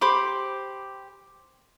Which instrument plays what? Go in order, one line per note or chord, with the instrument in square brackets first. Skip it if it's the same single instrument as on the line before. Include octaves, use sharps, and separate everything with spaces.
[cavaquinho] G4 C5 B5 D6